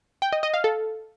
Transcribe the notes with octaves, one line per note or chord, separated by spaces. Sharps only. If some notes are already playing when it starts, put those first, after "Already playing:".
G5
D#5
D#5
F5
A4